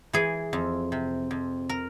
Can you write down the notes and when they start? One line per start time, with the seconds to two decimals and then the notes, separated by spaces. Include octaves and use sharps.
0.13 E3 G#4
0.53 F2
0.92 C3
1.31 F2
1.69 A#4